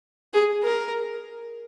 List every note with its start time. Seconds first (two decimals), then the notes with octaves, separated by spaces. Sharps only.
0.33 G#4
0.63 A#4